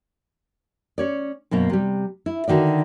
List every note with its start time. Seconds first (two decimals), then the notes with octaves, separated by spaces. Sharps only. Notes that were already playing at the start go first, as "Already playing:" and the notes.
0.98 C#4 C#5 D5
1.51 F#2 B2 A#3 C5
1.70 C3 G3
2.26 E4
2.48 D3 D#3 F#4 D5